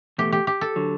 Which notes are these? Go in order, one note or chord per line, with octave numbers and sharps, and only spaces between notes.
E2 B2 A3 G4
G4
G4
A4
D3 F#3